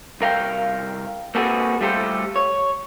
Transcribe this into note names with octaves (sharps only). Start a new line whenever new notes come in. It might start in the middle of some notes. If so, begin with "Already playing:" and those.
C2 A#4 F5 G5
A#3 C4 F#4 G#4 A4 B4
G3 A3 F4 G4 A4 C5
C#5